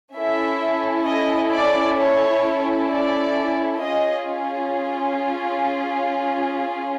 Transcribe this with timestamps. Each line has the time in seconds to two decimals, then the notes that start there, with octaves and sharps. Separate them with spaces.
0.13 C#4 E4 A4 E5
1.05 D#5
1.52 D5
1.98 C#5
2.90 D5
3.82 C#4 F4 G#4 D#5